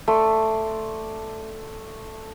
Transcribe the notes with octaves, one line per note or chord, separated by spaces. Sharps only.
A3 D5 C6